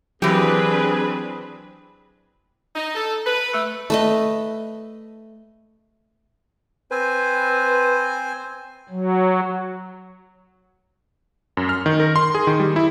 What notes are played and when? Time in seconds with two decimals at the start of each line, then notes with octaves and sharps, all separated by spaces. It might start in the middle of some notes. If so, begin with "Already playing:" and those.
0.22 E3 F#3 C4 D4 G4 G#4 B4
2.76 D#4
2.94 A4
3.25 B4
3.53 A3
3.90 A3 B4 D#5
6.91 C4 B4 C5 G#5
8.89 F#3
11.57 F#2
11.69 F6
11.86 D#3
12.00 A#4
12.16 C6
12.35 G#4
12.47 D#3
12.60 G3
12.76 E4